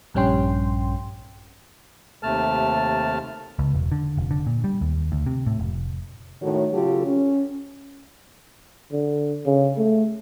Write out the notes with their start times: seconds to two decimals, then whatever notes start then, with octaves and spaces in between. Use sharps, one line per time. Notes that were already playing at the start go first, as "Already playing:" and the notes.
0.14 A#1 G2 G3 C#4 G5 C6
2.23 D#2 C3 A3 A5 F6
3.59 C#2
3.74 E1
3.92 D3
4.17 F1
4.31 D3
4.47 A#2
4.64 G3
4.81 D#2
5.12 D2
5.26 C3
5.46 A2
5.60 F1
6.41 A2 D#3 A3 F#4 C#5
6.72 C#3 F#3 F4 G4 A4
7.05 C#4
8.92 D3
9.46 C#3
9.77 A3